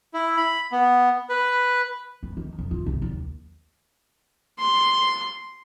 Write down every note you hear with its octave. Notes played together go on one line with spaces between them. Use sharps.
E4
B5
B3
B4
C#2
D#3
F2
F4
C2
D#2
C6